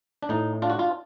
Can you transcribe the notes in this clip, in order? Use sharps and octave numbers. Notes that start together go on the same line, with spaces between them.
D4
A2 D#4
D4 F4
F#4
F4